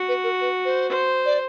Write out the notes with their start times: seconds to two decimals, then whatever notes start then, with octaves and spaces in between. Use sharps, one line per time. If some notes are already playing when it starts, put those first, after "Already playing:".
Already playing: F#4
0.08 B4
0.24 A#4
0.41 B4
0.65 C5
0.89 C5
1.26 D5